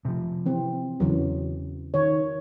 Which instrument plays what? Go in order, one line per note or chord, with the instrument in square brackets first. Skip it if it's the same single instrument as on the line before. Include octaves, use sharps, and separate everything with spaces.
[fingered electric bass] C3 F3
[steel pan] E3 C4
[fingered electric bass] E2 [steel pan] C#3 E3 F#3
[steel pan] D#3 C#5